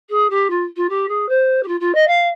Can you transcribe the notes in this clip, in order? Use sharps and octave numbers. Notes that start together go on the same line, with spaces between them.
G#4
G4
F4
F4
G4
G#4
C5
G4
F4
F4
D#5
F5